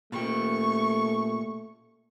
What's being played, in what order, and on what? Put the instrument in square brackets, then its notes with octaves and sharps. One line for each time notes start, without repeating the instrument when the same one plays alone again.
[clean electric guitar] A#2 G4 [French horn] A3 [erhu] C#6